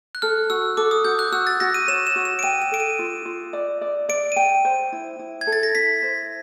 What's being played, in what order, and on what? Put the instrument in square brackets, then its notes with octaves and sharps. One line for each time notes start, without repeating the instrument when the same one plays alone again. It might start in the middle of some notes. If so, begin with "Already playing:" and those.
[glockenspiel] F#6
[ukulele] A4 [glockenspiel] F6
[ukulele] F#4 [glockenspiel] E6
[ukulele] A4 [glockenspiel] D6
[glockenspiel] D#6
[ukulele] F#4 [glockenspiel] G6
[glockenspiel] F#6
[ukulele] F#4 [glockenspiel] E6
[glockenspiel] A6
[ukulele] F#4 [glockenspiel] A#6
[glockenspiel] D#7
[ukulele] C#5 [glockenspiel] E7
[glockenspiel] E7
[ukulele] F#4
[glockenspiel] E7
D7
[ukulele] G5 [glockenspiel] D#7
[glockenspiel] E7
[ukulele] A4 [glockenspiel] D7
[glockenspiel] D#7
[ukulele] F4
F4
D5
D5
[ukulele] D5 [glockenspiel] D7
[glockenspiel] D#7
[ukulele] G5 [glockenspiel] D7
[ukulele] C5
E4
E4
[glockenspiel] G#6
[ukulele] A4
[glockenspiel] A6
A#6
[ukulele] E4 [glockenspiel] B6
[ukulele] C5